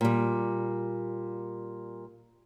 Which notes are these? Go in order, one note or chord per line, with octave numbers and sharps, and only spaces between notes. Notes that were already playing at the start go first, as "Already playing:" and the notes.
A#2 G3